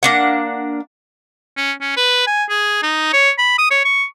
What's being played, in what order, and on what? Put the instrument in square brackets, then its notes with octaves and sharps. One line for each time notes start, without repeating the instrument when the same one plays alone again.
[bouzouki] A#3 D4 F#5
[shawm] C#4
C#4
B4
G#5
G#4
D#4
C#5
B5
D#6
C#5
C#6